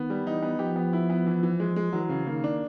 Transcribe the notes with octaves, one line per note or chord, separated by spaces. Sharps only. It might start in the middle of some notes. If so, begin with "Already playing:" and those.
Already playing: D#3 B3
G3
E3 D#4
B3
F3 G4
B3
E4
B3
E3
E3
G#3
G#3
E3 F#3
C#3
D#3 A#3
D4